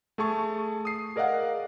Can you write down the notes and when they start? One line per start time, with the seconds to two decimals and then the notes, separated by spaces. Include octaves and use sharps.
0.18 A3 G#4 A5 C#6
0.85 D#6 C7
1.16 G#4 A#4 D5 D#5 F5 F#5